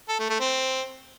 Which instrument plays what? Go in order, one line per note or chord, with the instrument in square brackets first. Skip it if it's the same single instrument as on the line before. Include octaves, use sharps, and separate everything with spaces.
[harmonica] A4
A3
A3
C4